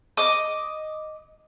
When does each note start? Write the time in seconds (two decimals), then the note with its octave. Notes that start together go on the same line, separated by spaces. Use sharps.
0.17 D#5 D6 D#6